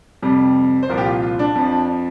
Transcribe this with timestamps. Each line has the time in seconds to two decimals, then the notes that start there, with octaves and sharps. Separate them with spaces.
0.23 F2 C3 G3
0.83 C5
0.89 C2 A#2 F3 A#4
0.98 G4
1.06 F4
1.22 F4
1.39 D4
1.55 F2 F3